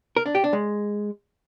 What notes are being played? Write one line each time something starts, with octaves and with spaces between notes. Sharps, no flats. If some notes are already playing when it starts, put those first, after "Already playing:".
A#4
D4
G4
D4
G#3